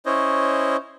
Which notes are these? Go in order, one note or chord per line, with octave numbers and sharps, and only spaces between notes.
C#4 E4 C5 C#5 D#5